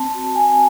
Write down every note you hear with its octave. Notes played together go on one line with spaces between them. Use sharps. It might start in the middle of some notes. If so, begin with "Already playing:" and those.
Already playing: C4 A5
F#4
C4 G#5